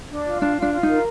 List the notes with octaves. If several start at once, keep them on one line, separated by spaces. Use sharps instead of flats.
D4
F4
D4 F5
F4
D4
F4
D#4
A#4